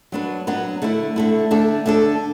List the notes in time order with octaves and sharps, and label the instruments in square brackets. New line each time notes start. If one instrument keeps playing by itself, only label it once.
[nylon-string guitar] F#3 B3 D4 B4
F#3 B3 D4 B4
D3 A3 E4
D3 A3 E4
D3 A3 D4 A4
D3 A3 D4 A4